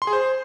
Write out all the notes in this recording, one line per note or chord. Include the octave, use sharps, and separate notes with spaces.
C6
G#4
C5